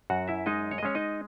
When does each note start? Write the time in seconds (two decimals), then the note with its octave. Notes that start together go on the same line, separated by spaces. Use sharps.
0.10 F#2 F#4 F#5
0.28 E4 E5
0.46 G#3 D#4 D#5
0.71 C#5
0.78 D#5
0.83 G#3 C#4 C#5
0.95 D#4 D#5